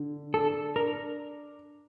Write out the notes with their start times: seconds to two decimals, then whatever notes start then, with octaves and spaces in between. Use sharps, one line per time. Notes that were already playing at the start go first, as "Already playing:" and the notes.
Already playing: D3
0.34 D4 A4
0.76 D4 A#4